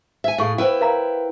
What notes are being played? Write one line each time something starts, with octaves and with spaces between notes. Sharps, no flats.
E5 G#5
A2 G#4 F5 C#6
E4 B4 C5 F#5 G5
A#4 F5 A#5